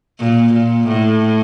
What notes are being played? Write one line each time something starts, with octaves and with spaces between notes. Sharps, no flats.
A#2
A#2
A2